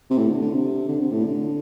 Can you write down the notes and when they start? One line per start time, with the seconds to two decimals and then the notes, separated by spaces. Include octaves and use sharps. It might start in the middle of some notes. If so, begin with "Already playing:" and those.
0.11 C3
0.18 A2
0.30 D3
0.42 D3
0.54 C3
0.89 D3
1.01 C3
1.12 A2
1.24 D3